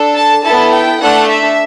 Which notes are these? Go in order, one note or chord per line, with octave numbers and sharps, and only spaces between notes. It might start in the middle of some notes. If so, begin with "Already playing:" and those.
Already playing: D4 A4
A5
B3 E4 A4 A5
G5
A3 D4 A4 F#5
E5